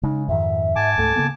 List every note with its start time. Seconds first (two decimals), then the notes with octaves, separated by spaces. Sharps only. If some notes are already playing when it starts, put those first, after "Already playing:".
0.03 C#3 G#3 D#4
0.28 F2 G#2 D#3 E5
0.76 G#2 G#5 A5 D6
0.97 C#2 G#2 A3 A4
1.16 C#3 A#3 B3